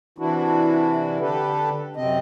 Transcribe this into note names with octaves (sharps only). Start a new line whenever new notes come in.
C3 E3 D4 E4 F#4
D3 D4 G4 A4 B4
F#2 C3 C4 D#5